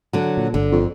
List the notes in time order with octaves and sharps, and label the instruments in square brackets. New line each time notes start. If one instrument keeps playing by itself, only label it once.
[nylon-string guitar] D3 F#3
[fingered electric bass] A#2
[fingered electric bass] G1 [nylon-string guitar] D3
[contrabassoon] F2